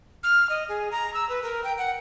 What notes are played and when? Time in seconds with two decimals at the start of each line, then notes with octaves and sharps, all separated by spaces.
0.23 F6
0.50 D#5
0.69 G#4
0.92 A#5
1.14 E6
1.29 B4
1.43 A#4
1.64 G5
1.78 F#5